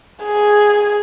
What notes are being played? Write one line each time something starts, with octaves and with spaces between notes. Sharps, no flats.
G#4